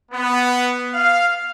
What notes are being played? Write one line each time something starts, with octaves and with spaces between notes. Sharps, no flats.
B3
F5